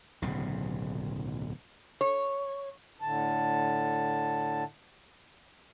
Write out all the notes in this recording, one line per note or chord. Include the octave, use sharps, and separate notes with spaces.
D1 B1 C#3
C#5
A2 D3 A5